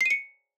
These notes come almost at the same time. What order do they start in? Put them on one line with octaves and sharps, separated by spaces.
C7 D#7 C#7